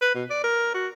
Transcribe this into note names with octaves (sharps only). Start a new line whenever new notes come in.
B4
B2
D5
A#4
F#4